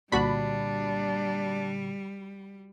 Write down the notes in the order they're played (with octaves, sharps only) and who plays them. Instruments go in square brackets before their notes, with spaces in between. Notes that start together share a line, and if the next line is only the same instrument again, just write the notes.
[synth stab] C2 F#4 B5 [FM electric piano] A#2 D3 [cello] G3 [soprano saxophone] D4